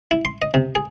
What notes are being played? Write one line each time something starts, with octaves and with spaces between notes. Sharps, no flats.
E4
C6
D#5
C3
G#4